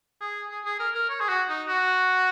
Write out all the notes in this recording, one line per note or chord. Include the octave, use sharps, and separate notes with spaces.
G#4
G#4
G#4
A#4
A#4
C#5
G#4
F#4
D#4
F#4